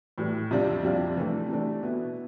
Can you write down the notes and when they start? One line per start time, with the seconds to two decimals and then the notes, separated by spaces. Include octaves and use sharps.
0.18 A2 E3 G3
0.51 F2 C3 G3 D4 F4
0.83 F2 C3 G3 D4 F4
1.16 C3 E3 A3 D4
1.49 C3 E3 A3 D4
1.83 B2 B3 E4